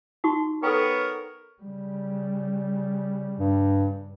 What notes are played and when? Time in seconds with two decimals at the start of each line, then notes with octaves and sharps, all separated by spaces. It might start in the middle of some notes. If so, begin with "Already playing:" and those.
0.24 D#4 F#4 C#6
0.63 B3 A4 A#4 C#5 G5
1.62 C#3 G3
3.40 G2